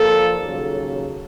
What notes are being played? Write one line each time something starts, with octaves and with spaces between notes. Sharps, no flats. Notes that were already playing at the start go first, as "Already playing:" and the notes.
Already playing: A#2 F3 A#3 A4
D#2 C#3 F#3